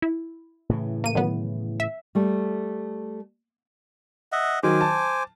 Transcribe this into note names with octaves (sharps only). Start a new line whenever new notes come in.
E4
A2 C#3 E3
A#3 D#7
D#3 F#3 B3
E5
G3 A3
D#5 E5 F#5
D#3 F#3 C5 G#5 D6
A5